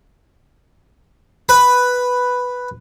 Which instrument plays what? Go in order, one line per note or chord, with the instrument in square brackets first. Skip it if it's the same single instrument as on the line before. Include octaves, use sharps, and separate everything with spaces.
[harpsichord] B4